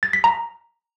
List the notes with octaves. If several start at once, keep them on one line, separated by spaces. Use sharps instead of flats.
A6
B6
A#5